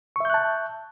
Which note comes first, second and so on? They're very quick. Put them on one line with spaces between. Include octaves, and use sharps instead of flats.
C#6 E5 G6 F#6 A5